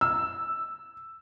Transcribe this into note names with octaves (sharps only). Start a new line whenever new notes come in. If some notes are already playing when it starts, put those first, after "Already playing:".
E6